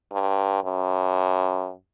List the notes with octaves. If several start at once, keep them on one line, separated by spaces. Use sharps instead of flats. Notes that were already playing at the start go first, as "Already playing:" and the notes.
G2
F#2